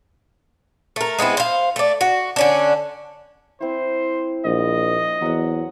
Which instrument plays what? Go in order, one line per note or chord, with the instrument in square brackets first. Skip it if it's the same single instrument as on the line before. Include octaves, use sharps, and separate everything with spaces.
[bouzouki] A3 A#4
G#3 B3 C4 E4
C5 F5
A3 D5
F#4
D3 C#4 D4
[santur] C4 E4 [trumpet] C5
[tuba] A#1 [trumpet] D#5
[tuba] E2 [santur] F#3 F#5